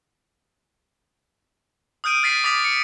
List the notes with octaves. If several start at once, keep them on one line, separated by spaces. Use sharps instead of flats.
D#6 F6 G6 D7 D#7
F6 A6 B6 C7 D#7
D6 D#6 A6 B6 F7
C#7